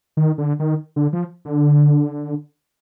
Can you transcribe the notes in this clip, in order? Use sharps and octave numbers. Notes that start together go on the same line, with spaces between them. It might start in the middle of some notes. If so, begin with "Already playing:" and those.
D#3
D3
D#3
D3
F3
D3